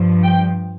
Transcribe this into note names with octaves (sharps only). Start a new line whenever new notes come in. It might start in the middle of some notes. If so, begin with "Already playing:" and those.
Already playing: G2 F3
G5